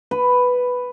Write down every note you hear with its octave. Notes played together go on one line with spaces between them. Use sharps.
B4